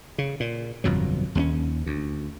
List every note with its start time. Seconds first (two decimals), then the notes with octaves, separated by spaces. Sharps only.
0.18 C#3
0.40 A#2
0.84 G1 F2 B2 F#3
1.35 D#2 A#3 C#4
1.86 D2